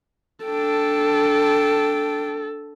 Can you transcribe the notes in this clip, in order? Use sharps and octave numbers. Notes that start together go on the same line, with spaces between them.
D4 A4 G5